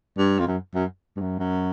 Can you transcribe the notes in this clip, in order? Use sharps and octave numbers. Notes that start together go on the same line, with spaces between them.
G2
F2
F#2
F#2
G2
F#2
F#2